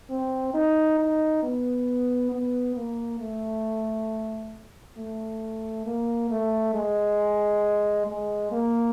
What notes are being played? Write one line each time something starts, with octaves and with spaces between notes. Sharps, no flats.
C4
D#4
D#4
B3
B3
A#3
A3
A3
A#3
A3
G#3
G#3
A#3